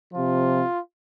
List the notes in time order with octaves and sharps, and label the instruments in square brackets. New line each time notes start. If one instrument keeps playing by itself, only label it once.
[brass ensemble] C3 F3 F4